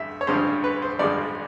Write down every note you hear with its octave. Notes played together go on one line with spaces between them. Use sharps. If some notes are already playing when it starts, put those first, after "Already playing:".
Already playing: A1 G2 D3 E5
C#5
A1 G2 D3 F3 G#3 C5
B4
C5
A1 G2 D3 F3 G#3 D5